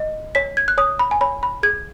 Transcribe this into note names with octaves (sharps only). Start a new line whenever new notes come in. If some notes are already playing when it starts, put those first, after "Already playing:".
Already playing: D#5
C#5 B6
G#6
F#6
C#5 D#6
B5
G#5
C#5 B5
B5
G#4 G#6